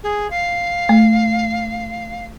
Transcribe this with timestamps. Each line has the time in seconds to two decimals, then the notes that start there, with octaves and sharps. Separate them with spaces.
0.03 G#4
0.30 F5
0.89 A3